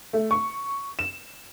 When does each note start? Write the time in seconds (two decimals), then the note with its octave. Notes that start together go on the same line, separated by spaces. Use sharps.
0.13 A3
0.31 C#6
0.99 E7